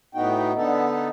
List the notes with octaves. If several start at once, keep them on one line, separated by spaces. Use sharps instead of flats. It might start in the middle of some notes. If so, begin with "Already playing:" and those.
A2 B3 D#4 F#4 G5
D3 B3 D#4 A4